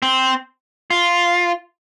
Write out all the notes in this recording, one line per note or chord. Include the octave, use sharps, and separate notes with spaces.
C4
F4